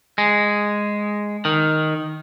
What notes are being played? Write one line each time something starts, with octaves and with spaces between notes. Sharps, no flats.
G#3
D#3